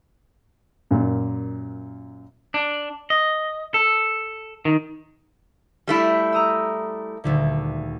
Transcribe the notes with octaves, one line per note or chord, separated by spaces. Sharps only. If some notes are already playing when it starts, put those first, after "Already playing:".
F#2 A#2
D4
D#5
A4
D#3
G3 A3 E4
A#5 D#6 E6
D#1 D2 D3